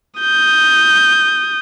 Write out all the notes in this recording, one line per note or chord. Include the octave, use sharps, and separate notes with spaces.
D#6 G6